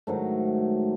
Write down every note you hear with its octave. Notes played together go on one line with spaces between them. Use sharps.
G#2 D#3 F#3 A3